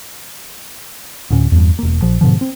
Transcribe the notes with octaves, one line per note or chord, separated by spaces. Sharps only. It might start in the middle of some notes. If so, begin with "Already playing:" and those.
D2 A2 C#4
E2 G2
E1 A#3
A#1 F3
G#2 B2 D3 F3
C4